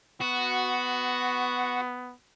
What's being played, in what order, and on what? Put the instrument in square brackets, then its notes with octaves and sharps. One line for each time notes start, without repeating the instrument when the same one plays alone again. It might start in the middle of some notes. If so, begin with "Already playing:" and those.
[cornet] B3 [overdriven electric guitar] F#4